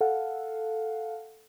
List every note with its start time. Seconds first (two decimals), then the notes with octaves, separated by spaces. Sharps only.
0.01 A4 F5 F#5